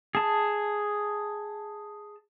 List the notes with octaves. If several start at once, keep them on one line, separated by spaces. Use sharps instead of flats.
G#4 A5